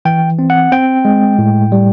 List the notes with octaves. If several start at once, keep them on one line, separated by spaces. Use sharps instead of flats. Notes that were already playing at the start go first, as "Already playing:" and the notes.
E3 G5
C4
F#5
C4 G5
G#3
A2
G3